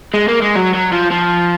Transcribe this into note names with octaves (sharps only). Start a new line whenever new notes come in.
G#3
A#3
G#3
F#3
F#3
F3
F3